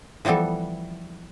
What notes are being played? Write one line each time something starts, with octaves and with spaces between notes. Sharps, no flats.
E3 F3 G3 B3 A4